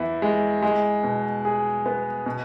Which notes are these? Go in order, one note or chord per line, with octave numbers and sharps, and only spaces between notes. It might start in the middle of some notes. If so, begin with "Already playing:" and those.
Already playing: E2 E3 E4
G#3
G#3
B2
G#4
B3
B2